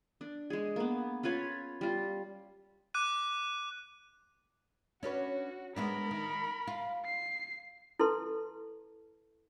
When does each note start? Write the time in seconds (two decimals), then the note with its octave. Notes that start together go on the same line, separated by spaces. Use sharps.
0.21 D4
0.50 G#3 G#4
0.76 A#3 B3
1.23 C#4 F4 B4 C#5
1.81 G3 F4
2.94 D6 F#6 D#7
5.03 C#4 D4 F#4 B4
5.76 G#3 B3 D4 A#4 B5
6.11 D#3
6.67 F4
7.05 C7
7.99 E4 A4 B4 A5 C6